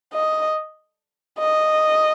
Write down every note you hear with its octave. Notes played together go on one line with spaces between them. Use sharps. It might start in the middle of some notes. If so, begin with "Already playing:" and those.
D#5
D#5